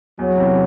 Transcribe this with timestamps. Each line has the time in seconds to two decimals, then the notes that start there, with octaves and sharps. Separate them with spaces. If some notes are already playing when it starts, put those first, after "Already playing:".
0.18 E2 F#3
0.37 C3 E3